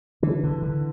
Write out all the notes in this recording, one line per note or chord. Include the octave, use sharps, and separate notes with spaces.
D3 E3
D3
D3